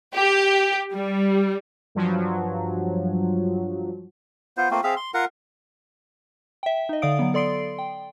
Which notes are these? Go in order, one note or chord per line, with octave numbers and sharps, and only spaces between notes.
G4
G3
G2 F3 F#3
B3 F4 C5
A3 A#3 C4 F4
C4 G#4 E5 F5
C6
F4 A#4 F#5
E5 G5
D#4 D#5
D3 D5 F5 D#6 D7
F#3 B3
A4 D5 C6 C7 D7
G5